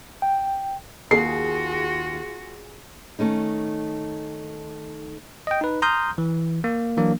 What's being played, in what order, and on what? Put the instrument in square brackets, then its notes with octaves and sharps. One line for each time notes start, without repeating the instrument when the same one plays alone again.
[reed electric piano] G5
[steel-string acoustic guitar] D#2 [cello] F4 F#4 [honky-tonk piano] G#4 [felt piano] C7
[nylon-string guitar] D#3 A3 C#4 D#4
[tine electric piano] D#5 G5
D#4 B4
A#5 C6 D#6 F6 G6
E3
A#3
E3 F#3 A#3 D4